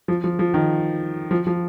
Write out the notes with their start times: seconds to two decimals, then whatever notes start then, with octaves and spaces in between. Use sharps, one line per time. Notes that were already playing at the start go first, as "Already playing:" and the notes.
0.08 F3
0.24 F3
0.39 F3
0.54 D#3
1.31 F3
1.47 F3